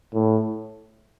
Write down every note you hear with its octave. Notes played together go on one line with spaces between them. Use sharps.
A2